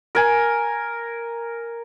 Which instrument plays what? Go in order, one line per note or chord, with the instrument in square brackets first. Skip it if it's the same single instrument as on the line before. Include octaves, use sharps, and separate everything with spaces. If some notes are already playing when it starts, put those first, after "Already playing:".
[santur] A#4 G#5